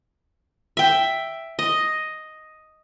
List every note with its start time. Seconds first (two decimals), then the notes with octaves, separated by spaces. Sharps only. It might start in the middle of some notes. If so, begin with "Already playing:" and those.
0.77 E5 G5
1.59 D#5